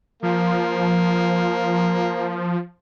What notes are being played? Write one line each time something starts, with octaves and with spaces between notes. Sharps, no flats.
F3 A#3